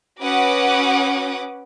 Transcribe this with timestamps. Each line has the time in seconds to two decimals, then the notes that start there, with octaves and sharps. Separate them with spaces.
0.21 C#4 F#4 B4 F#5 D6 D#6